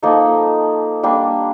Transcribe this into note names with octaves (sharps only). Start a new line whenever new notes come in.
F3 A#3 D#4 A4
G3 A#3 D4